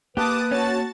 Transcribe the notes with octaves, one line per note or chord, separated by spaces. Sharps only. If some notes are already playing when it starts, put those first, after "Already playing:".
A#3 G4 B4 A5 D6 D#6
C#4 F#4 A5 A6